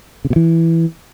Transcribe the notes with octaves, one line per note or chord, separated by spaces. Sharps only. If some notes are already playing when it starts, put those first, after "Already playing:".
C#3
B2
E3